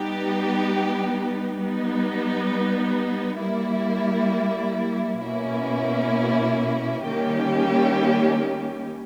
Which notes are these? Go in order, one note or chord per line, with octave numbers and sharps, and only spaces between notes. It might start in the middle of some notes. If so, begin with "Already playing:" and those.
Already playing: G3 B3 D#4 G4
G3 B3 D#4
G3 A#3 E4
B2 A#3 C#4 E4
D#3 G3 A#3 C#4 G4